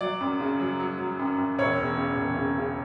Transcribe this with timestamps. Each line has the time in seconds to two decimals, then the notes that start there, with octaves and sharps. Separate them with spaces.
0.01 F#3 D5
0.21 F#2
0.40 C#3
0.60 F#3
0.80 F#3
0.99 F#3
1.19 F#2
1.38 F#2
1.59 E1 C#5
1.78 E2
1.98 C#3
2.17 E1
2.37 C#3
2.58 C#3